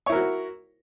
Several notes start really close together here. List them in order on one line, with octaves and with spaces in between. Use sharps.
C#5 E4 A#4 F#4